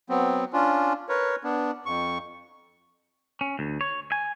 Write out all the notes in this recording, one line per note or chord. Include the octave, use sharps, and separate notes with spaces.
F#3 B3 C4
C#4 D4 F4
A#4 B4 C#5
B3 D4
F2 C#6
C#4
D2
C#5
G#5